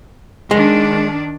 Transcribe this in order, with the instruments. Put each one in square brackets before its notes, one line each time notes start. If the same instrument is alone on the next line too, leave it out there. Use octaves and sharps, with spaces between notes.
[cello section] D#3 D4 [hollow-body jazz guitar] G#3